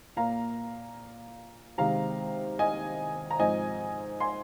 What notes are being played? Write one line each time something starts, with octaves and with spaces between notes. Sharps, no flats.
A#2 A#3 F5 A#5
C3 D#3 G#3 C4 F5 A#5
D#5 G#5
A#5
G#2 F3 C4 D#5 G#5
G#5 C6